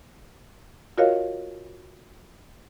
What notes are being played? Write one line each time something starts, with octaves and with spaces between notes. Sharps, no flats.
F4 F#4 A#4 C#5 D#5 F5